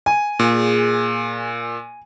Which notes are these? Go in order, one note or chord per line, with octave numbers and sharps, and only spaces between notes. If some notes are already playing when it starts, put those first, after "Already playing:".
G#5
A#2 G#4